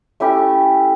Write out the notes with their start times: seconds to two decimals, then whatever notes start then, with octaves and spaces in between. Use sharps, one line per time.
0.20 A3 C#4 E4 G4